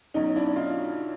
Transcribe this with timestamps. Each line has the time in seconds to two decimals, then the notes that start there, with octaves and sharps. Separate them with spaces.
0.14 B1 B2 C#4 D#4
0.36 D4 E4
0.56 D#4 F4